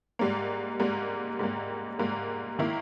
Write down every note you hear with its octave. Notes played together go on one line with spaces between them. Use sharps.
G#2 G3 A#3
G#2 G3 A#3
G#2 G3 A#3
G#2 G3 A#3
D#3 A#3 E4